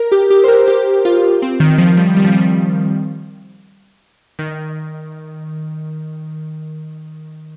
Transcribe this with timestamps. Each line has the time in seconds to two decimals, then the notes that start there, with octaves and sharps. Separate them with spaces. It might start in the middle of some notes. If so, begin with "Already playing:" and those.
Already playing: A#4
0.12 G4
0.30 G4
0.44 C5
0.48 A#4
0.68 G4
1.05 F4
1.42 C4
1.60 D#3
1.78 F3
1.97 G3
2.17 G3
2.24 F3
2.33 G3
4.39 D#3